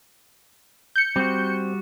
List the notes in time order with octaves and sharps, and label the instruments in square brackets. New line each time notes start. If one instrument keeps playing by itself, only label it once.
[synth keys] G6 C#7
[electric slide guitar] G3 F#4 [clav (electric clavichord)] C4